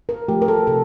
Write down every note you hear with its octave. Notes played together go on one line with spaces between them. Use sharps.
A#4
F3 A3 G4
A#4
A4
C3 A4